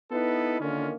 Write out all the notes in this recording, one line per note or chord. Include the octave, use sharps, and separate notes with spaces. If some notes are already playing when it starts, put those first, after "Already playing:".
B3 D#4 E4 A4 B4
D3 D#3 A#3 C#4 F4